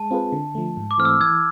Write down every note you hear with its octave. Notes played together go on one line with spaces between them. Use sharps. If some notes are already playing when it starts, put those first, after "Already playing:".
Already playing: G#3 A5
C4 F4 G#4 B4
D3
F3 A3
G#2
D6
E3 A3 C4 F6
E6
E3 E6 G#6